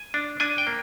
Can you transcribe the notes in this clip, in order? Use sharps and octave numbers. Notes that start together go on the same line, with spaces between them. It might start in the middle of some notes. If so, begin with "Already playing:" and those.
Already playing: G#5
D4
D4 G#5
G5
A#3